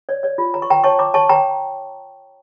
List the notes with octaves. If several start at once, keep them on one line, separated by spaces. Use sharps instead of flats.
C#5 D5
C#5 D5
F4
C#5 A#5
C#6
C#5 G5 A#5
C#5 A5 C#6
C#5 A#5 D6
C#5 A5 C#6
C#5 G5 A#5